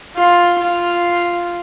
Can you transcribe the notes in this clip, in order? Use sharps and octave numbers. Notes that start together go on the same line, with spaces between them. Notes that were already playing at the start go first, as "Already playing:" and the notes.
F4
F4